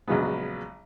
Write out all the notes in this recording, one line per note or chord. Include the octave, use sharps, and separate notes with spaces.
A#1 C#3 F#3 G#3 B3